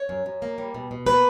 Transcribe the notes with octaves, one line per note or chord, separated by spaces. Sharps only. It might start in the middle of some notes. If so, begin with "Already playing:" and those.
Already playing: C#5
F#2
F#2
A#3
G3
B2
B2
A#3 B4